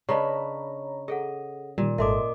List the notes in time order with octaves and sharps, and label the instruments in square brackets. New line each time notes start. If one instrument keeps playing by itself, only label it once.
[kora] C#3 D4 B4 [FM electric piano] C#5 A#5 [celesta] D#5 B5 C#6
[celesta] G#4 A4 F#5 [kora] D#5
[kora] A#2 [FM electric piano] D#3 G3
[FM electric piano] G#1 G#2 A4 [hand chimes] A#4 D#5 D6 [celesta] E5 C6